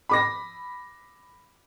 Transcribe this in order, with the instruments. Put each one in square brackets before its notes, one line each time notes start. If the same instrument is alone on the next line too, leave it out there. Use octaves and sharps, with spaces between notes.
[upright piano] B5 D6 A#6